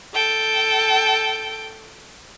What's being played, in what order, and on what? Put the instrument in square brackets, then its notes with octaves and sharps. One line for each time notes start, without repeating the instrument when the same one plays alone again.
[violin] A4 G5